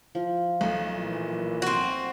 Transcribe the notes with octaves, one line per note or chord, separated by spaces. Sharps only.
F3
B1 A3
A#2 E3
C4 F#4